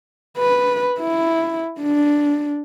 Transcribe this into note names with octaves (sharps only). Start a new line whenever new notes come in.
B4
E4
D4